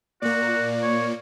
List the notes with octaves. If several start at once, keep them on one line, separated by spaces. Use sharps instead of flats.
A#2 A#3 F#4 D5
C#5